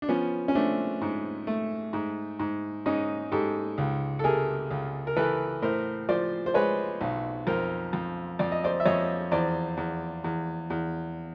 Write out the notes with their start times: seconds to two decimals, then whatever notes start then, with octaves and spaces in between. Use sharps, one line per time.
0.02 D4
0.09 F3 B3 C#4
0.48 C#4
0.55 A3 C4 D4
1.02 G#2
1.47 A3
1.93 G#2
2.39 G#2
2.86 G#2 C#4 D#4
3.32 G#2 G4 A4
3.78 C#2
4.19 A4
4.24 C3 G#4 A#4
4.71 C#2
5.07 A#4
5.16 E3 A4 B4
5.62 A2 A#4 C5
6.09 F3 C5 D5
6.46 C5
6.54 G#3 B4 C#5
7.01 B1
7.47 F2 A#4 C5
7.93 F2
8.39 F2 D5
8.52 D#5
8.64 C5 D5
8.80 E5
8.85 F2 C#5 D#5
9.31 E2 C5 D5
9.77 E2
10.24 E2
10.70 E2